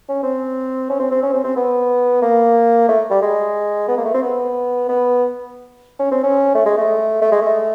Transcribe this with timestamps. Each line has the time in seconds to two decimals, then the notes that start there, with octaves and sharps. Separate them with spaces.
0.09 C#4
0.23 C4
0.90 C#4
1.00 C4
1.11 C4
1.23 C#4
1.33 C4
1.44 C4
1.56 B3
2.22 A#3
2.89 A3
3.11 G3
3.22 G#3
3.88 B3
3.97 A#3
4.05 A3
4.14 C4
4.22 B3
4.89 B3
5.99 C#4
6.11 C4
6.23 C#4
6.55 A3
6.66 G#3
6.77 A3
7.22 A3
7.32 G#3
7.42 A3